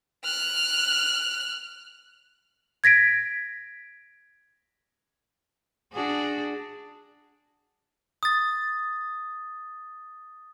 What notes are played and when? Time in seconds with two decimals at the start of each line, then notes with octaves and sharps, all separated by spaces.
0.24 F6 F#6
2.84 G#6 A#6 B6 D7
5.93 D4 F#4 G#4
8.23 D#6 A6